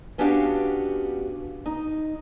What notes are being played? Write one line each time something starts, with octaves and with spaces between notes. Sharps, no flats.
B3 C#4 D4 F#4 G4 F5
D#4